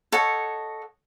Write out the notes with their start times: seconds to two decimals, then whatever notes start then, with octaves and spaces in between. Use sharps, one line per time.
0.12 A4 C#5 D#5 F#5